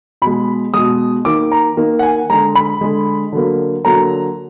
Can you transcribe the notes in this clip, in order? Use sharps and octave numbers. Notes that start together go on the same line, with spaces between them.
B2 G#3 B5
B2 G#3 D#6
D#3 A#3 D6
A#5
D#3 A#3
F#5
G#5
D3 G#3 A#5
B5
D3 G#3
D3 F#3 A#3
D3 F#3 A#3 A#5